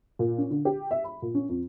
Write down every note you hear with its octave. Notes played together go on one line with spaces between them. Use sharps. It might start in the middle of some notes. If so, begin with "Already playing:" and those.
A#2
C#4
D3
G4
E5
B5
A#2
C#4
F2